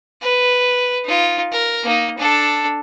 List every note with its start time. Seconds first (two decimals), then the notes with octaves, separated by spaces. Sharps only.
0.21 B4
1.05 D#4 F4
1.53 A#4
1.84 A#3 D#4
2.18 D4 A4